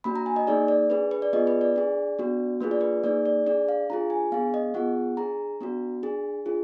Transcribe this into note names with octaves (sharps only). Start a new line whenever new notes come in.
A#3 D4 F#4 B5
A#5
G#5
D#5
A#3 D#4 G#4 D5
D5
D4 G#4 B4
B4
D5
B3 F4 G#4 D#5
B4
D5
D4 G#4
B3 D4 F#4
A#3 D4 F4 G#4 B4
D5
B4
A#3 D#4 G#4 D5
D5
D4 G#4 D5
F5
D4 F4 G#4 A#5
G#5
B3 D4 G#4 F5
D#5
B3 F4 G#4 F#5
D4 G#4 A#5
B3 D4 F#4
D4 G#4
D4 F4 G#4